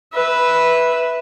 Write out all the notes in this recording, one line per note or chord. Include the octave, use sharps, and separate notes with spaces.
B4 E5